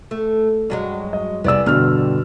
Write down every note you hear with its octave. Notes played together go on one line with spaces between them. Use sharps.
A3
G2 F#3 G#3
D#5
C2 B3 G#4 D5 E6
E2 G2 B2 D3 F6